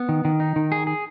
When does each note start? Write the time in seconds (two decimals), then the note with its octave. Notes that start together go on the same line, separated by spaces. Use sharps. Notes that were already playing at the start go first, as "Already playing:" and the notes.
Already playing: B3
0.09 D#3
0.25 D#3
0.40 D#4
0.56 D#3
0.72 G#4
0.87 G#4